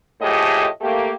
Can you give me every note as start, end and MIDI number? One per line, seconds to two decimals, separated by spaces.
0.22 0.67 45
0.22 0.67 53
0.22 0.67 57
0.22 0.67 67
0.22 0.67 68
0.22 0.67 75
0.81 1.12 57
0.81 1.12 58
0.81 1.12 67